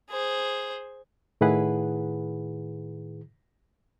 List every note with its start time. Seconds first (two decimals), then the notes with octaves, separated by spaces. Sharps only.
0.10 G#4 C5
1.41 A2 D#3 E4 G#4 B4 F#5